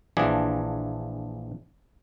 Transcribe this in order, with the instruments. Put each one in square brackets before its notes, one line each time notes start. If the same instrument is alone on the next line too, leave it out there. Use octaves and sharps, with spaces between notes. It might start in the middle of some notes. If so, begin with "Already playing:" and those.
[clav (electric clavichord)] A#1 E3 F3 D4 G#4